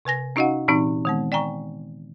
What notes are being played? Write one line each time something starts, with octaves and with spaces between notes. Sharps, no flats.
C3 B4 G#5 A#6
C#4 D#4 F#4 D#5 F5 F#5
A#2 E3 C4 D#4
D#3 G#3 B3
D5 G5 G#5 A#5 C#6